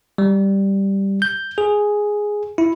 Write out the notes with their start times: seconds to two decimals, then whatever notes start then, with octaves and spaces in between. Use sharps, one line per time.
0.18 G3
1.22 G6
1.58 G#4
2.58 E4